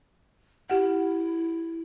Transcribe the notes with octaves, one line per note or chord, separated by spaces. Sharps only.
E4 G4 F#5